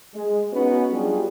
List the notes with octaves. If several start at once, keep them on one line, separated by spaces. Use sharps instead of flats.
G#3
B3 C#4 D#4 F#4 B4
F#3 G3 D4 F4 G4 G#4